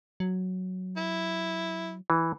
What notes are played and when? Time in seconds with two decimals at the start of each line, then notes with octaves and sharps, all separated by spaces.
0.20 F#3
0.97 E4
2.10 E3